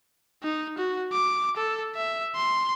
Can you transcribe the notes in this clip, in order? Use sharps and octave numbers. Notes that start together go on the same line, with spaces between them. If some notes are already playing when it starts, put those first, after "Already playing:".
D#4
F#4
D6
A4
E5
C6